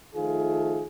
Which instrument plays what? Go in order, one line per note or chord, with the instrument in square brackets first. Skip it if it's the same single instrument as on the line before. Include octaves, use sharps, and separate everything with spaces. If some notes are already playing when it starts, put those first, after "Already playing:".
[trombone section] D#3 F3 A3 F4 G#4